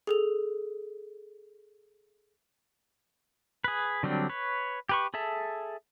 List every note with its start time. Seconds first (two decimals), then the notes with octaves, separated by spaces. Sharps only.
0.07 G#4 A4 F7
3.64 G#4 B4
4.03 D3 F#3 G3 C4 D4
4.29 B4 C#5
4.89 G4 B4 C#6
5.14 G#4 A4 E5 A5